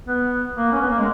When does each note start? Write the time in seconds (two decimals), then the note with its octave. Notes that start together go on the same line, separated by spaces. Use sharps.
0.06 B3
0.56 A#3
0.72 C#4
0.81 B3
0.90 A#3
0.98 G#3